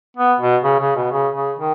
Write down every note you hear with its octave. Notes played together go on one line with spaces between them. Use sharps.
B3
B2
C#3
C#3
B2
C#3
C#3
D#3